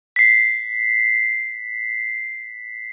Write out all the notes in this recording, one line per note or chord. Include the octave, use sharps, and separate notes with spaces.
B6 C7